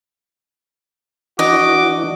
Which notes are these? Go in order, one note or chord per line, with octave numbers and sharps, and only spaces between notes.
E3 D4 F#4 D#5 D6